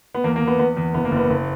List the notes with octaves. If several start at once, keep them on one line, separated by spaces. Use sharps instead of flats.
B3
E2 A#3
A#3
E2
B3
E2 B3
E2
F#1 B3
A#3
F#1
B3
F#1